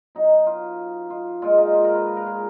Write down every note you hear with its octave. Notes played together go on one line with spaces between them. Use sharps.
B2 F#3 D#4
F4
F4
A#2 G#3 F4
D#4
F4
A#4
B4
A#4
G#4